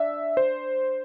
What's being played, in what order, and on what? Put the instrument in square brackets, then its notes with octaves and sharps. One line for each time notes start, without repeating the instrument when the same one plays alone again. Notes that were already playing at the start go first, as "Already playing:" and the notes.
Already playing: [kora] D4 [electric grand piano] E5
[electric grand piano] C5